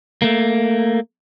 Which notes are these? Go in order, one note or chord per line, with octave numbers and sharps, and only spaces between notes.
A3 A#3